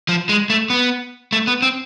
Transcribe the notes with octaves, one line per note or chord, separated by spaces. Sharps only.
F3
G#3
A3
B3
A3
B3
C4